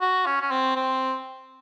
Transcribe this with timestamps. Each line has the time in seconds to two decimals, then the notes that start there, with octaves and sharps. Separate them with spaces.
0.01 F#4
0.26 C#4
0.41 C#4
0.51 C4
0.76 C4